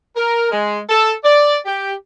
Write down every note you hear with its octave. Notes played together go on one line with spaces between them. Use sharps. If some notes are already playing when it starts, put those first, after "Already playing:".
A#4
G#3
A4
D5
G4